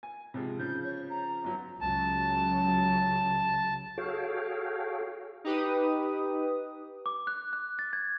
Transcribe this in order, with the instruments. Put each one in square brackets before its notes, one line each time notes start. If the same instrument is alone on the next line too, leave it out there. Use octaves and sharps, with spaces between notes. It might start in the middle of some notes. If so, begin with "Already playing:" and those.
[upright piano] G#5
C3 F3 G#3
[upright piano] C#3 F3 [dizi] G6
[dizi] C#5
A#5
[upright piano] G1 F#3
[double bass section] C#2 C#3 F#3 [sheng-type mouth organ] A5
[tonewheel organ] F#4 G#4 A4 C#5 F5 G5
[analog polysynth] D#4 G4 B4 D#6
[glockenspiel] D6
F#6
F#6
A6
G#6